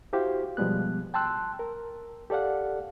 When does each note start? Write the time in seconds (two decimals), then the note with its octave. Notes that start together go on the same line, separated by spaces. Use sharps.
0.13 E4 F#4 G4 C5 F5
0.57 B2 F3 G3 G#3 B3 F#6
1.14 G5 A5 C6 E6 F#6
1.59 A#4
2.30 G4 A4 D5 F5 F#5